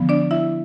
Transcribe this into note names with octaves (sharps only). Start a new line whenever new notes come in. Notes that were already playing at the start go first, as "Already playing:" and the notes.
Already playing: D3 F3 B3
D4 D5
E4 E5